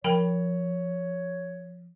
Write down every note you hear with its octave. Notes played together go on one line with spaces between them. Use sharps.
F3 A#4 C#5 G5 B5